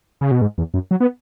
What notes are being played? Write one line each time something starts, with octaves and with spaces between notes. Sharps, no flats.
C#3
B2
G#2
E2
F#2
F#3
B3